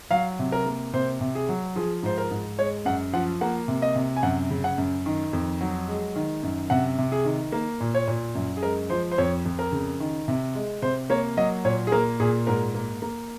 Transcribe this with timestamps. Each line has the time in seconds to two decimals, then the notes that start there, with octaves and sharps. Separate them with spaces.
0.11 F#3 F5
0.39 C3
0.52 A#4
0.66 A#3
0.93 C3 C5
1.21 C3
1.35 G#4
1.49 F#3
1.76 F3 G#4
2.03 G#2 C5
2.18 A#4
2.31 G#2
2.58 G#3 C#5
2.85 F#2 F#5
3.13 F3 F#5
3.41 A#3 F#5
3.68 C3
3.82 D#5
3.96 C3
4.17 G#5
4.23 F#2 F#5
4.51 C#3
4.64 F#5
4.78 F#2
5.06 D#3
5.33 F2
5.61 F#3
5.88 G#3
6.16 D#3
6.43 F#2
6.70 C3 F#5
6.98 C3
7.12 G#4
7.25 D#3
7.52 A#3
7.80 A#2
7.95 C#5
8.07 A#2
8.35 F#2
8.57 G#4
8.63 G#3 A#4
8.90 F3 C5
9.11 C5
9.18 F2 C#5
9.45 F2
9.59 A#4
9.72 C#3
10.00 D#3
10.28 C3
10.55 G#3
10.82 C3 C5
11.10 A#3 C#5
11.37 F#3 D#5
11.64 A#2 C#5
11.87 G#4
11.92 A#3 A#4
12.20 A#2 G#4
12.47 G#2 A#4
12.75 A#3
13.02 A#3